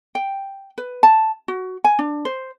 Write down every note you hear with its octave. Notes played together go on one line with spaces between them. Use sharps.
G5
B4
A5
F#4
G#5
D4
C5